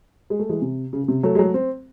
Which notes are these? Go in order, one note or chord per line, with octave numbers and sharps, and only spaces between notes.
G#3
A3
E3 G#3
C3
C#3
C#3
C3
F#3 A3
G#3
F#3 A3
C4